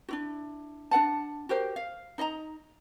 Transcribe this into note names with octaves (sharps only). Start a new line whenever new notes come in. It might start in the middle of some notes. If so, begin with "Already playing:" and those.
D4 E4 F#4
D4 A#4 F#5 A5
F#4 G4 A#4 C5
F5
D#4 D#5 F5 A#5